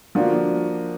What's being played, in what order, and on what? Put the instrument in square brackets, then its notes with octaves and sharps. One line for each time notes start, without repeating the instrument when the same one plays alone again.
[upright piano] D3 F3 A#3 D4 F#4